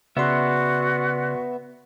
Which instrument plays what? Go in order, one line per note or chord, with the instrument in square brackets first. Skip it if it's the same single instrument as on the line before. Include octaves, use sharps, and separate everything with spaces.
[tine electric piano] C#3 D5 C6 [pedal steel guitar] B3 E5 [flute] F#4